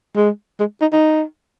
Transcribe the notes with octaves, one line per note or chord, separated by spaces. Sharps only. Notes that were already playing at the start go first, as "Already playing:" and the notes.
G#3
G#3
D#4
D#4